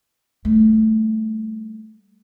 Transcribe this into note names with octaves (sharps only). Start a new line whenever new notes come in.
G3 A3